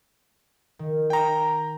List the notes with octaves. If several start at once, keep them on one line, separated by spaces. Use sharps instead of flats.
D#3
G5 A#5